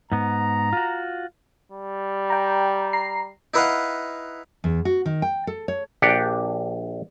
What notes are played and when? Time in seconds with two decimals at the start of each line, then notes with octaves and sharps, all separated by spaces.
0.12 G#2 B3 A#5
0.73 F4 F#4
1.72 G3
2.30 G5 A#5
2.93 A#5 C7
3.54 D#4 E4 B4 D#5 F5 F#5
4.64 E2
4.85 F#4
5.06 D#3
5.22 G5
5.47 A4
5.68 C#5
6.02 A#1 D4 G4 F#5 G5